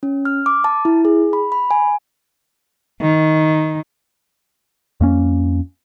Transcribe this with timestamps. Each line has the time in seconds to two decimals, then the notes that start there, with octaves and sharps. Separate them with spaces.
0.03 C#4
0.25 F6
0.46 D6
0.64 A5
0.85 E4
1.05 G#4
1.33 B5
1.52 B5
1.71 G#5
3.00 D#3
5.01 F2 A#3 C#4